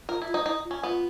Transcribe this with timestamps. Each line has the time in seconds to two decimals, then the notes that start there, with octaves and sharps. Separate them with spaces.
0.09 F4 A#4
0.22 E4
0.27 F4
0.34 D#4
0.46 D#4 E4
0.65 F4
0.71 C#4
0.83 B3 F4